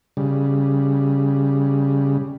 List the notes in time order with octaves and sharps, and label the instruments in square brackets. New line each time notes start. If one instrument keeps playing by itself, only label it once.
[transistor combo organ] C#3 G3